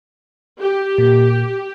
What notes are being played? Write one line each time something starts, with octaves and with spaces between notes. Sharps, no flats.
G4
A#2